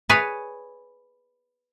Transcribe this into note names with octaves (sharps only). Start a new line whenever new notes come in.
G#4 B4 C#5 D5 G#5